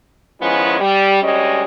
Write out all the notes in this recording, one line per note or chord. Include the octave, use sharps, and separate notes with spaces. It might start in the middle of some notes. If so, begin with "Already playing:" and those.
D#3 F3 G#3 B3 C#4 E4
G3
D2 G3 G#3 C#4 D#5